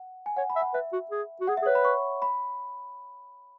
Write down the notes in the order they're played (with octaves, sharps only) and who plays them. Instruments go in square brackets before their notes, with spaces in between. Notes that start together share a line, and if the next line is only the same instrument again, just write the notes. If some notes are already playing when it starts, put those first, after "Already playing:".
Already playing: [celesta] F#5
G#5
[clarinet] C#5 [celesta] F#5
[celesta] B5
[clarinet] E5
[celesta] F#5
[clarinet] B4 [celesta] E5
[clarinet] F#4
G#4
F#4
[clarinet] G#4 [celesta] F#5
[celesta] E5
[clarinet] G#4
[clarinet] B4 [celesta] C#5
[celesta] B5
C#6
B5